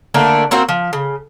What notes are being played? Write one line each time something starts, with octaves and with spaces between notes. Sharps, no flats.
D3 A3 A#3 D4
A#3 C4 F#4 C5
F3
C#3